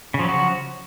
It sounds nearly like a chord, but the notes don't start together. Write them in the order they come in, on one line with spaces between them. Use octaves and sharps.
C#3 F3 F#3 F#4